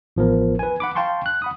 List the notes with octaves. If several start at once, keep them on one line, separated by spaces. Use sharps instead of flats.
A1 F3 B3 A#4
B4 G#5
F#5 B5 D6
F5 G5 A5 C6 C#6
F#6
F#5 B5 D#6